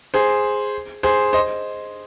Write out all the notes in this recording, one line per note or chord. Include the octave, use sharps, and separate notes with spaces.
G#4 C5
G#4 C5
C5 D#5